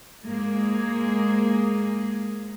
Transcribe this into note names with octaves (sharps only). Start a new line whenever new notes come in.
G#2 G#3 A#3 G#4